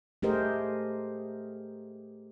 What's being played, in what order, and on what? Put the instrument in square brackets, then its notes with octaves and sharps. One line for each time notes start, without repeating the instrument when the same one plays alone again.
[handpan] A3 G4 G#4 A#4 C5 D#5